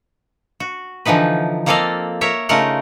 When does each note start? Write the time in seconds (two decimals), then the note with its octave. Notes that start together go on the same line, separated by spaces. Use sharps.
0.60 F#4
1.05 D3 E3 F3 D#4 B4
1.66 A#3 C4 A4 D5 D#5 F5
2.21 A#4 C#5 E5
2.49 C#3 A3 D#4 F4 A#4 F#5